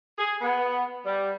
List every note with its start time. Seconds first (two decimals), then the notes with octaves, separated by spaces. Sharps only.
0.19 G#4
0.41 B3
1.05 G3